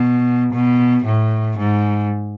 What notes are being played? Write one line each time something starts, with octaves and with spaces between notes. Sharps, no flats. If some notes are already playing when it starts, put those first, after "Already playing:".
Already playing: B2
B2
A2
G#2